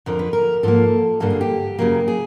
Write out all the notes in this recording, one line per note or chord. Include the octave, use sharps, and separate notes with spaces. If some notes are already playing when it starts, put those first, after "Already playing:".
F2 D3 F3 A#4
B4
A#4
G#2 F3 A#3 A4
G2 D3 G3 A#3 A4
G#4
G4
F#2 C#3 F#3 A#3
G#4